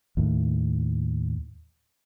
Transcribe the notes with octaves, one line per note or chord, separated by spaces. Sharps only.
D#2 A2